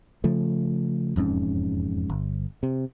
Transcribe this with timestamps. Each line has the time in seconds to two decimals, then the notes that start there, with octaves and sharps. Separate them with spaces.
0.24 C#3 F3 A3
1.16 E1 F2 G#2 C#4
2.09 G1
2.63 C3